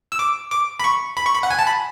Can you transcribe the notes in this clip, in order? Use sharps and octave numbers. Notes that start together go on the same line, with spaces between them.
E6
D6
D6
B5
C#6
B5
C#6
B5
F#5
G#5
A5
B5